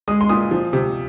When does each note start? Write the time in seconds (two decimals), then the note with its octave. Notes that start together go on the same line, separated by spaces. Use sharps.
0.08 G#3 D#6
0.21 C6
0.29 A#2 D#6
0.51 F3
0.73 C3